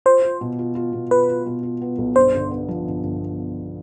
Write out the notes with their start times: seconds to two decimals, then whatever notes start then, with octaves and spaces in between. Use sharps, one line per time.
0.06 F4 C5
0.22 F4
0.41 B2
0.59 F4
0.75 F4
0.93 B2
1.11 F4 B4
1.29 F4
1.46 B2
1.63 F4
1.82 B3
1.98 B1
2.16 G2 C5
2.34 G1
2.51 B3
2.68 F3
2.87 G1
3.04 G1